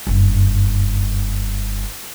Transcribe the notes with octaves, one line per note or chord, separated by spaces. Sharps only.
F#1 G2